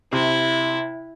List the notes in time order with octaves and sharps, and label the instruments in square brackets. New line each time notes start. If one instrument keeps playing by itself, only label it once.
[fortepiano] C3 [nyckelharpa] E4